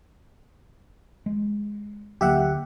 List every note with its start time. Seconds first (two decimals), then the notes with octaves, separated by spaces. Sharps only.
1.26 G#3
2.21 D2 F#3 A#3 G4 E5 F#5